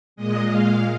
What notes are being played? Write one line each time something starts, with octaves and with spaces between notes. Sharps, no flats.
A#2 G#3 D#5
F5